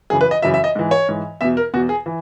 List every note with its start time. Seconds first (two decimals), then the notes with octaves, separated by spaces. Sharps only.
0.10 F#2 C#3 E3 G#4
0.21 B4
0.31 D#5
0.42 F#2 C#3 E3 E5
0.54 E5
0.64 D#5
0.75 G#2 E3
0.91 C#5
1.09 G#2 E3
1.41 E2 B2 E5
1.57 A#4
1.74 E2 B2 F#4
1.89 G#4
2.06 E3